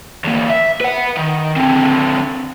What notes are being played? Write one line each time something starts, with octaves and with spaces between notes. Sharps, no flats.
E2 A#3
E5
B4 F#5
D#3
D3 C4